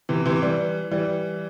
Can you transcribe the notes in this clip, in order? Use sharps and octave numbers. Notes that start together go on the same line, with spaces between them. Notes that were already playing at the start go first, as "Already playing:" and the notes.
C3 E3
C3 E3
E3 G3
E3 G3